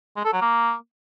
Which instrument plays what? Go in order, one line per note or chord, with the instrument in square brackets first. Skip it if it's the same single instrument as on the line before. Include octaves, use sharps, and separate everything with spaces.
[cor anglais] G#3
A4
F#3
A#3